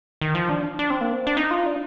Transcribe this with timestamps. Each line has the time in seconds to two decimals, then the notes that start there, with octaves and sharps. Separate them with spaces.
0.21 D#3
0.35 F3
0.49 D4
0.79 D4
0.90 C4
1.01 A#3
1.13 C4
1.27 D4
1.37 D#4
1.51 F4
1.66 D4